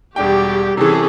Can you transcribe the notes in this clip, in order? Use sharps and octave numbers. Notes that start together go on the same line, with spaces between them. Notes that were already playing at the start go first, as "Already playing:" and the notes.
E1 G3 D4 F#4 G4 G5
C3 E3 C#4 G#4 A4